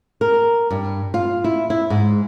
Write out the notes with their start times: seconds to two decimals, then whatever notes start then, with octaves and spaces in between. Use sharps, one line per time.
0.21 A#4
0.71 G2
1.14 F4
1.44 E4
1.70 E4
1.90 G#2